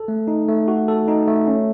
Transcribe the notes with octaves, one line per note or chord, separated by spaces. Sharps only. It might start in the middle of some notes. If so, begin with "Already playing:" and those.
Already playing: A4
A3
D#4
A3
F#4
A4
D#4
A3
C#4